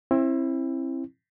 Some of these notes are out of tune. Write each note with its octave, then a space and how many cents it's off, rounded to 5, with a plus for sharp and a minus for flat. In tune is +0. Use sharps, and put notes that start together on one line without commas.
C4 +35 E4 +0